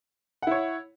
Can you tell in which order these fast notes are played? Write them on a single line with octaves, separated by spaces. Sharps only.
F#5 E4 C#5